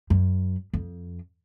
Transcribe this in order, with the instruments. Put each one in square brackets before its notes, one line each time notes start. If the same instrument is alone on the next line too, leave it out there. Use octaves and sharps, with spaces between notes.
[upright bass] F#2
F2